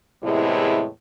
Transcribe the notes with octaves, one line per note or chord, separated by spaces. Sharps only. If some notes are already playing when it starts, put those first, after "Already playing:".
E2 A2 C3 G#3 E4